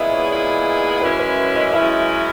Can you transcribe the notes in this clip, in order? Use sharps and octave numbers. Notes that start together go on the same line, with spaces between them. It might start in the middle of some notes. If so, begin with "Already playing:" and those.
Already playing: A#2 G#3 B3 E4 G#4 E5 F#5
C#5
A#2 G#3 B3 E4 G#4
F#2 E3 G#3 C#4 E4 B4
B4
C#5
D#5
F#2 E3 G#3 C#4 E4 E5